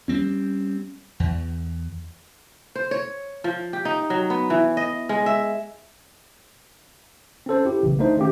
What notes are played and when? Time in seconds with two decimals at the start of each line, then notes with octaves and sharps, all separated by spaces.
0.08 G3 A3 C4 C#4
1.20 E2
2.75 C5
2.91 C#5
3.44 F3
3.73 G4
3.85 D#4
4.10 F#3
4.30 B3
4.50 E3
4.77 D#5
5.09 G#3
5.26 E5
7.46 C4 C#4 A4 C5
7.65 E4 G4
7.83 B1 C#3 E3
7.99 A3 A#3 D4 D#4 C5
8.17 D#3 A3 A#3 C#4 G4